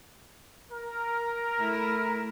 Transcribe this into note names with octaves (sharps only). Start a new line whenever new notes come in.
A#4
A3 E4